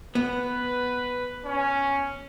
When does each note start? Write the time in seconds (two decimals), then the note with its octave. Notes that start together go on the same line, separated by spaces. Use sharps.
0.15 B3 B4
1.45 C#4